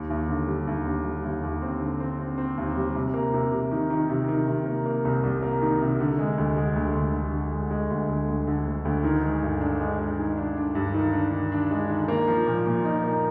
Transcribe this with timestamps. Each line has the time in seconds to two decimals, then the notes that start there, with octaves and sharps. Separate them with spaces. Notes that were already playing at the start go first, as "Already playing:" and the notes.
Already playing: D#2
0.10 D#2
0.29 D3
0.47 G3
0.67 D#2
0.85 D3
1.05 G3
1.24 D#2
1.43 D#2
1.62 C4
1.81 D3
2.00 C4
2.19 C4
2.38 C4
2.57 D#2
2.76 G3
2.95 C3
3.14 A#3
3.34 C3
3.52 C3
3.71 D#3
3.90 D#3
4.09 C3
4.28 D#3
4.48 C3
4.66 A#3
4.86 A#3
5.05 C2
5.23 C2
5.42 A#3
5.62 D#3
5.81 C3
6.00 D3
6.19 G#3
6.38 D2
6.56 G#3
6.76 D2
6.95 D2
7.13 D3
7.32 D3
7.52 G#3
7.70 G#3
7.90 D2
8.09 D2
8.28 D2
8.47 D3
8.66 D2
8.85 D2
9.04 D#3
9.24 G#3
9.42 G2
9.61 D4
9.80 G#3
9.99 G#3
10.18 D#3
10.37 D4
10.57 D4
10.75 G2
10.94 D#3
11.13 D4
11.32 D#3
11.52 D4
11.71 G#3
11.90 D#3
12.08 A#3
12.27 F3
12.47 A#2
12.66 A#2
12.84 D#4
13.04 A#3